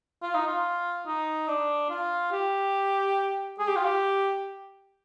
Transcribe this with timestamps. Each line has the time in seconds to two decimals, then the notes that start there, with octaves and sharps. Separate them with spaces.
0.22 F4
0.34 D#4
0.47 F4
1.07 D#4
1.48 D4
1.90 F4
2.32 G4
3.59 G#4
3.68 G4
3.76 F4
3.85 G4